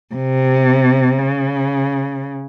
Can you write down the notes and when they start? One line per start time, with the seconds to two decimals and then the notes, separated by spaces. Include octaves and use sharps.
0.15 C3
1.18 C#3